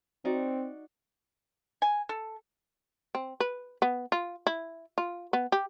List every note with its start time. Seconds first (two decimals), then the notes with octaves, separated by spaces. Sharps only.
0.25 C4 D#4 F#4 D5
1.82 G#5
2.09 A4
3.15 C4
3.40 B4
3.82 B3
4.12 F4
4.47 E4
4.98 F4
5.33 B3
5.52 G4